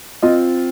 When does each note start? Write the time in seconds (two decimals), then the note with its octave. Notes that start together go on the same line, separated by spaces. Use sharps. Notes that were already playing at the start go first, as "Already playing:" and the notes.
0.23 C4 F4 D#5